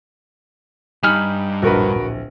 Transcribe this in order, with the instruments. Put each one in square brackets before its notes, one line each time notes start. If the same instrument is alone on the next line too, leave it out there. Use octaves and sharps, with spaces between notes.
[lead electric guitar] G2 G3 [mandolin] D#4 B5 F6 [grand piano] G#5
[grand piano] D1 A#1 [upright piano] F#4 A#4 B4